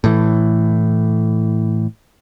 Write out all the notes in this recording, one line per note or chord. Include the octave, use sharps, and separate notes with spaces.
A2 E3